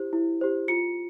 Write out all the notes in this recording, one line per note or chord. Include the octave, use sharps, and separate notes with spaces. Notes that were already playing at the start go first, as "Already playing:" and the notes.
Already playing: E4 G4 C5
E4
G4 C5
F4 C#7